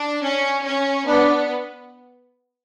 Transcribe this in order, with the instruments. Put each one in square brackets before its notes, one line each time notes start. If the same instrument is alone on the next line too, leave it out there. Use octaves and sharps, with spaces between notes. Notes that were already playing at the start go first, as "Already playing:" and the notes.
Already playing: [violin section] D4
C#4
C#4
[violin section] B3 [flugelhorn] D4